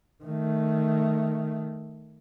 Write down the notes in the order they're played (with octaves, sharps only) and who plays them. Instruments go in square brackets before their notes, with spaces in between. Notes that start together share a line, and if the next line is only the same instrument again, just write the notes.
[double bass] D#3 A3